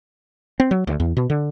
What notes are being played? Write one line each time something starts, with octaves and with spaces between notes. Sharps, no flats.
C4
F#3
D2
E2
B2
D3